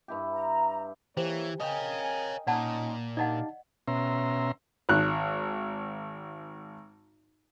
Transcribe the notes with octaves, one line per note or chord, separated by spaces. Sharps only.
G2 E4 G4
A#5
E3 A#3 G4 C5 C#5 E5
A#4 C#5 D#5 F5 G5 G#5
A#2 C#4 D#4 D5 F#5 A5
D4 D#4 G4 D5 D#5 F5 F#5 A5
B2 C#4 E5 A#5 C6
G#1 F#6